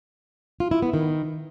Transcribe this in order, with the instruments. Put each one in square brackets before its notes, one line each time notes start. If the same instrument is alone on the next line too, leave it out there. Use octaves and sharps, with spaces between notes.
[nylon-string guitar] F4
E4
B3
D#3